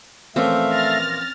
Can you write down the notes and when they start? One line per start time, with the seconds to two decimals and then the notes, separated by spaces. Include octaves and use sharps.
0.36 A#2 E3 F3 A3 C4 C#4 E5 F5
0.72 F6 A6 A#6